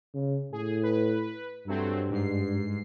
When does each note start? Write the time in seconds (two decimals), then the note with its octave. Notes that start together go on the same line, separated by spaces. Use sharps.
0.14 C#3
0.53 A2 G#4
0.83 B4
1.68 G2 F#3 A3 C4
2.11 G#2 C7